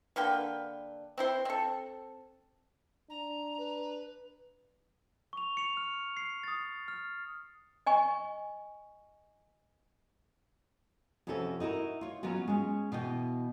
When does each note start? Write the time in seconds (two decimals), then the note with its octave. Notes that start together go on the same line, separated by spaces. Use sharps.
0.16 D3 A#3 B4 G5
1.18 C4 E4 C5
1.45 C4 A4
3.10 D4 A#5
3.57 B4
5.33 C#6 F7
5.57 C#7 F7
5.77 F6
6.17 C7
6.43 D#6 A6
6.88 F6
7.86 D#5 G#5 C#6
11.27 F2 C3 C#4 F#4 A4 A5
11.60 D#4 E4 F#4 A#4
12.01 F4 C#5
12.23 F#3 B3 C#4 F4 F#4
12.48 G#3 C#4
12.92 B2 E3 G5